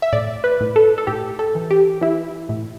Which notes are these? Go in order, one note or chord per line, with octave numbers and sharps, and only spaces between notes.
E5
A2 D5
B4
A2
A4
A4
A2 G4
A4
E3
G4
E3 E4
A2